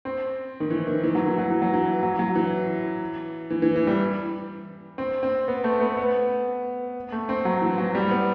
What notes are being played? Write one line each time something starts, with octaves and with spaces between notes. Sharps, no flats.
C4
D#3
E3
D#3
E3
F#3
E3
F#3
E3
F#3
E3
F#3
F#3
E3
E3
E3
E3
G3
C4
C4
B3
A3
B3
B3
A3
C4
F#3
E3
F#3
G3
B3